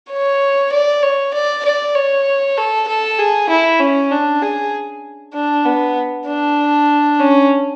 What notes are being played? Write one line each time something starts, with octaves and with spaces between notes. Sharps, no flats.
C#5
D5
C#5
D5
D5
C#5
A4
A4
G#4
E4
C#4
D4
G#4
D4
B3
D4
C#4